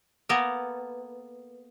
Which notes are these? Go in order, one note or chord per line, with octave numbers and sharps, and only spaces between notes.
A#3 B3 A4 A#4